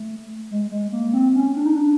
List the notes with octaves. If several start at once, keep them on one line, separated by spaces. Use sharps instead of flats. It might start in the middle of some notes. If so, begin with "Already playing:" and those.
Already playing: A3
G#3
G#3
A#3
C4
C#4
D4
D#4
D4